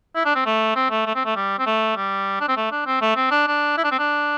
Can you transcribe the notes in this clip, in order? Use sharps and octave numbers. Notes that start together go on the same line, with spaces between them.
E4
D4
C4
A3
C4
A3
A3
C4
A3
G3
C4
A3
G3
D4
C4
A3
D4
C4
A3
C4
D4
D4
E4
D4
C4
D4